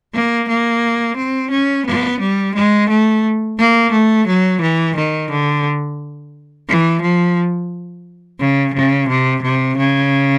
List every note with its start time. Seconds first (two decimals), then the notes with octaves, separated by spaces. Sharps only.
0.14 A#3
0.48 A#3
1.17 C4
1.51 C#4
1.86 B3
2.20 G3
2.54 G#3
2.89 A3
3.58 A#3
3.91 A3
4.27 F#3
4.60 E3
4.96 D#3
5.30 D3
6.68 E3
7.02 F3
8.39 C#3
8.74 C#3
9.08 C3
9.43 C3
9.77 C#3